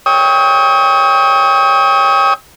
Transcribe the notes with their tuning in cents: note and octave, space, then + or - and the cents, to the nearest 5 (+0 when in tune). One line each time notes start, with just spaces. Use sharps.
C#5 +0 G5 +20 D#6 +40